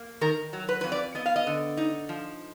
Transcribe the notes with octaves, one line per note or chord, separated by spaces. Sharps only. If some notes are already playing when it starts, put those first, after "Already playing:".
Already playing: A#3
D#3 A#4
F#3
B4
F2 B4
D5
B3 D#5
F5
D#5
D3
D#4
F3